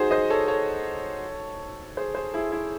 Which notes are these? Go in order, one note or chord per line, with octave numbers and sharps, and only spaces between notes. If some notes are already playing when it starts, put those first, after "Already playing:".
Already playing: D#4 F#4 G#4 C5
C5 D#5
A4 C#5
A4 C#5
G#4 C5
G#4 C5
E4 G#4
E4